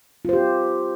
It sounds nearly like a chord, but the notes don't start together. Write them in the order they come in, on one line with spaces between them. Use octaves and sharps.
F4 C5 G4